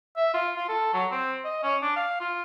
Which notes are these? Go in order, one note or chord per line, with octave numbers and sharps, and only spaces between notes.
E5
F4
F4
A4
F#3
C4
D#5
C#4
D4
F5
F4